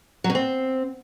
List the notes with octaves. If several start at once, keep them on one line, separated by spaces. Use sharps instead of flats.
F#3
B2
C4